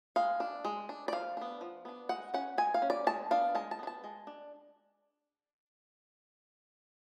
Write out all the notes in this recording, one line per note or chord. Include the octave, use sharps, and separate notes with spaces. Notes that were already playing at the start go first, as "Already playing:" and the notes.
G#3 F5
D4
G#3
D4
D5
F3 F5
B3 D4
F3
B3 D4
G#3 F#5
C#4 F#5
G#3 G#5
F5
C#4
D5
G#3 A5
B3 D4 F5
G#3 A5
A5
B3 D4
A5
G#3
D4